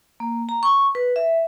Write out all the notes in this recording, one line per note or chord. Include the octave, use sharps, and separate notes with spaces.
A#3
A#5
C#6
B4
E5